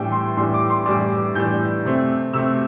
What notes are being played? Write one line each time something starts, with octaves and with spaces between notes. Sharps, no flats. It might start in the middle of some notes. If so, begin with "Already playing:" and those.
Already playing: A2 E3 G3 D4 G5
C6
A2 E3 G3 D4 C6
D6
C6
A2 E3 G3 D4 D6
A2 E3 G3 D4 G6
C3 A3 C4
C3 A3 C4 E6